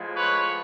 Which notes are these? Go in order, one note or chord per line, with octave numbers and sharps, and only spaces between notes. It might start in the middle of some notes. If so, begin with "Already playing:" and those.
Already playing: A2 F3 G#3
B4 C#5